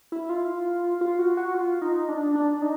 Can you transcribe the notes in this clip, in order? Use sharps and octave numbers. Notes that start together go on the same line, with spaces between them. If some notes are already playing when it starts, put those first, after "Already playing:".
E4
F4
F4
F#4
F#4
F4
D#4
D4
D4
D#4